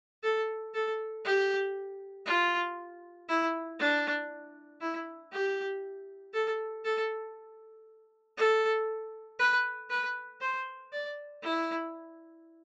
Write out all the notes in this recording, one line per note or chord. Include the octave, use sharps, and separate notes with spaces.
A4
A4
G4
F4
E4
D4
E4
G4
A4
A4
A4
B4
B4
C5
D5
E4